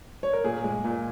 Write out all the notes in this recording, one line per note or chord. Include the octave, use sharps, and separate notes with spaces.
C#5
A#4
A#2 G#4
G#3
A#2